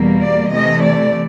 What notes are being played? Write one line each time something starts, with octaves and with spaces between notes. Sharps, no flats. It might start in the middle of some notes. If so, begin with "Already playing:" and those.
Already playing: E2 B2 G3 A#3
D5
C3 E3 A3 D#5
D5